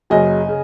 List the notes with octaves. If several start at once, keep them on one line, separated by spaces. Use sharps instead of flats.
F#1 F#2 C#3 F#3 D#5 G#5
C#3